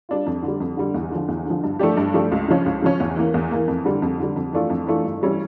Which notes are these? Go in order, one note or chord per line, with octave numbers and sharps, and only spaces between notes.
G3 D4 F4
F2
D3
G3
F2
D3 G3
E2
D3 F3
E2
D3 F3
G2
F3 A3 D4 G4
G2
F3 A3 D4 G4
C#2
C#3 F3 C#4
C#2
C#3 F3 C#4
E2
E3 A#3
E2
E3 A#3
F2
D3 G3
F2
D3 G3
F2
E3 A3 D4 F4
F2
E3 A3 D4 F4
G2
E3 G3 C#4 E4